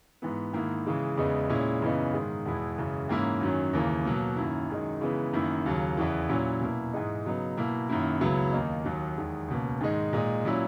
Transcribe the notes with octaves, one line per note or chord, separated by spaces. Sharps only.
G#2 E3 B3
G#2 D#3 A#3 E4
C#3 E3 G#3
E2 C#3 G#3 B3 D#4
A#2 G#3 C#4 E4
F#2 C#3 E3 B3 D#4
G#2 D#3 G#3
E2 B2 G#3 B3 E4
F#2 C#3 E3 G#3
G#2 E3 A#3 C#4 E4
F#2 D#3 F#3 C#4
D#2 C#3 E3 A#3
B2 F#3 A#3
F#2 D#3 A#3 E4
F#2 D#3 G#3 D#4
C#3 E3 G#3 B3 D#4
F#2 D#3 A#3 E4
D#2 C#3 F#3
E2 C#3 E3
A#2 F#3 C#4 E4
B2 A#3 E4
G#2 E3 G#3 D#4
C#3 F#3 B3 D#4
B2 A#3 E4
F#2 D#3 A#3 E4
C#2 C#3 F#3 B3 E4
D#2 D#3 A#3 D#4
D#2 D#3 F#3
E2 D#3 G#3
C#2 B2 A#3
G#2 D#3 G#3 D#4
A#2 G#3 D#4
A#2 F#3 C#4 E4